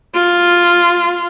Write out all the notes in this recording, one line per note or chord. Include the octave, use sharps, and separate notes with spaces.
F4